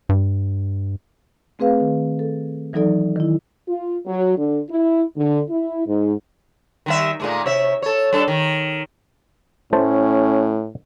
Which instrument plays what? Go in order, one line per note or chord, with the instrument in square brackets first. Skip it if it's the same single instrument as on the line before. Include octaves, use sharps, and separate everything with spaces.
[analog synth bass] G2
[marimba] A3 C4 G#4 B4 F5
D#3
A4
E3 F#3 D#4 A4 D5
D#3 E4
[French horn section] F4
F#3
D3
E4
D3
E4
G#2
[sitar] D#3 G3 E5
A#2 G#3 A3
C3 C#5 E5
A4 C#5
G3 D4 A4
D#3
[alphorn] A2 [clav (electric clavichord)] A3 C5 A5 [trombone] C#4